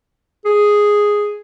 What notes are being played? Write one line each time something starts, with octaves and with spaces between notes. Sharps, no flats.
G#4